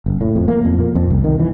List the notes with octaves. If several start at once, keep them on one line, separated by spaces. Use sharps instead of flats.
F#1
A2
F2
A#3
F2
A#2
F2
C2
D#3
E3